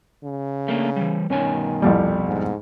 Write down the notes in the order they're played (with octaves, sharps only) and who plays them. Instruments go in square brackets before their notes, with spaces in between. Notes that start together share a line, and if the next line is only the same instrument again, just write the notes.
[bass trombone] C#3
[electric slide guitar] A3 A#3 D4
E3 G3
[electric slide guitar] G2 B2 G#5 [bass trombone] D#3 [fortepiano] C#4
[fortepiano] C2 F2 G3
[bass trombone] G#2